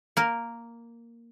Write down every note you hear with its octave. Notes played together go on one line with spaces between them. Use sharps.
A#3 A#4